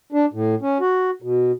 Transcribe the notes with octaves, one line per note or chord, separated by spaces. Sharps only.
D4
A2
C#4
F#4
B2